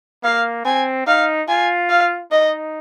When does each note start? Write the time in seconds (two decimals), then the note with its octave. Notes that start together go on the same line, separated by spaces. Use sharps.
0.23 A#3 F5
0.65 C4 G#5
1.06 D#4 F5
1.49 F4 G#5
1.90 F5
2.32 D#4 D#5